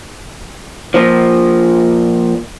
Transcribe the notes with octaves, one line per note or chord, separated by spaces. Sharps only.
A#2 F3